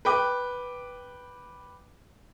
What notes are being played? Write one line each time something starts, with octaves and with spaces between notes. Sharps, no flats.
B4 G5 D6